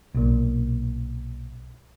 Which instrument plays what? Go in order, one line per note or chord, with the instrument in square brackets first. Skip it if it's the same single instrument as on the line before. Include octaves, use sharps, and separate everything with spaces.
[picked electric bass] B1 A#2